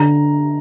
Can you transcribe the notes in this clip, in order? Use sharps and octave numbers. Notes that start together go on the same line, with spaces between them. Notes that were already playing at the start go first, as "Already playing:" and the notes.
Already playing: D3 A#5